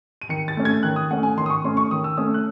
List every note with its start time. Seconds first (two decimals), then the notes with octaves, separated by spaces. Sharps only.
0.22 D#7
0.29 D#3 C#7
0.48 A6
0.57 A3 C#4
0.65 G#6
0.83 D#3 F#6
0.96 D#6
1.11 A3 C#4 F#5
1.23 G#5
1.37 D#3 C6
1.46 D#6
1.50 C#6
1.64 A3 C#4 C6
1.77 C#6
1.91 D#3 D#6
2.04 E6
2.17 A3 C#4 D#6
2.34 F#6